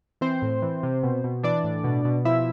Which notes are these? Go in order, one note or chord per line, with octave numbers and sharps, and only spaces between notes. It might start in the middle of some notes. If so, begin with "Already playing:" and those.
E3 C4 C5
A2
E3
C3
B2
B2
E3 D4 D5
A2
B2
B2
F3 E4 E5